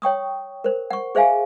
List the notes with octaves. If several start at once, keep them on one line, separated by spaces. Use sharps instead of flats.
C#5 G5 C#6 D#6
A#4 C5
F#5 C#6
G#4 C5 E5 F5 G#5